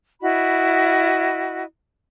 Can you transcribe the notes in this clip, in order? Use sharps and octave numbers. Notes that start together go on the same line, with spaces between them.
E4 F#4 D#5 B5